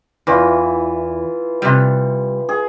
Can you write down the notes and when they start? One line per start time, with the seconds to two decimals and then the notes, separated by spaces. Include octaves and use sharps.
0.27 E2 E3 F4
1.62 C3 G3
2.49 G#4